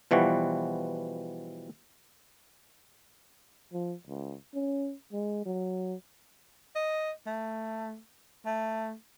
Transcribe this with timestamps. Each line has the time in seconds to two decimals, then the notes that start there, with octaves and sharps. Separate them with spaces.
0.11 B2 E3 F3 G3 F#4
3.73 F3
4.07 C#2
4.54 C#4
5.13 G#3
5.46 F#3
6.75 D#5
7.26 A3
8.46 A3